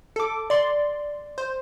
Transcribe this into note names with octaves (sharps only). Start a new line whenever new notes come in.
A4 D6
D5 C6
C5